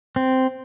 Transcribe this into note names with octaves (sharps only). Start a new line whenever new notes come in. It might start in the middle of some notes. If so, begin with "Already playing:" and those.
C4